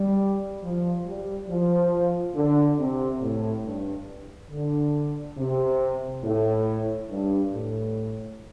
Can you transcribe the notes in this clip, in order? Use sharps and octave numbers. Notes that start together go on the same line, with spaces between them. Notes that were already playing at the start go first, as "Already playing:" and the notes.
Already playing: G3
F3
G3
F3
D3
C3
A2
G2
D3
C3
A2
G2
A2